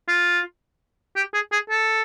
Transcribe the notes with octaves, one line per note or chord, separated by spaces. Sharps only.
F4
G4
G#4
G#4
A4